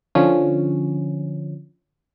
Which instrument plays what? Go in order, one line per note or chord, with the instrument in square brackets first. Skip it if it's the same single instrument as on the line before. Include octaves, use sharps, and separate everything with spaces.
[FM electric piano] D3 F3 C#4